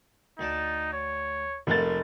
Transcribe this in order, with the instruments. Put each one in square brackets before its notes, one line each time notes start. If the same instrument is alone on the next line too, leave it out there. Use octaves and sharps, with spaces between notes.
[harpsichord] D2 D5 A5 [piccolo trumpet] D#4
[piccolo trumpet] C#5
[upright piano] F1 A6 [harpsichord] F3 A3 A#3